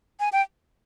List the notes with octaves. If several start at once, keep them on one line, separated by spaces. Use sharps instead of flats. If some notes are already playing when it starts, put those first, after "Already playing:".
G#5
G5